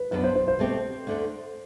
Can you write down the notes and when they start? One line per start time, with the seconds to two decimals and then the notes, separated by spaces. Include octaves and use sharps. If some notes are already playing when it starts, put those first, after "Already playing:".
Already playing: B4
0.11 F#2 F#3 B3 D4 B4
0.24 C5
0.36 C5
0.48 C5
0.59 B2 A3 C4 G4
1.07 D2 D3 A3